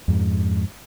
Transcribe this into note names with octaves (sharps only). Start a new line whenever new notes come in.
F2 G#2